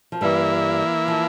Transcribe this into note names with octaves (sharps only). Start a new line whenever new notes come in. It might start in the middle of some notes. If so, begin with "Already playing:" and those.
F3
G2 E3 G3 A#3 E4
F3